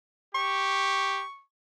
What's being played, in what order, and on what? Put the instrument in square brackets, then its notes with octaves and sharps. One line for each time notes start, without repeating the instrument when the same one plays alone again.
[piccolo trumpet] G4 [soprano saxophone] C#6